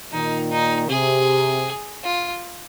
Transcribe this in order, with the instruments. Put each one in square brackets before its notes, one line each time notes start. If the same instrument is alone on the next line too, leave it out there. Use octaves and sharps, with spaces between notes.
[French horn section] A#2 D#3 [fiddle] D#4
[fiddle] D#4
[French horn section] C3 [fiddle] G#4
[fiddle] F4